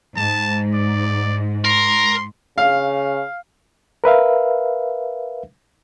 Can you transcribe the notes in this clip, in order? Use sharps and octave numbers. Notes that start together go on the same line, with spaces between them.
G#2 A5
D5
A#4 C6
C#3 F5
A#4 B4 E5 F5